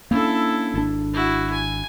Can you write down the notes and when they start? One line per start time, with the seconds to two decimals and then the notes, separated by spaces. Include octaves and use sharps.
0.11 A#3 C#4 D4 E4 A4
0.74 G#1 D4
1.13 E4 F#4
1.53 G#5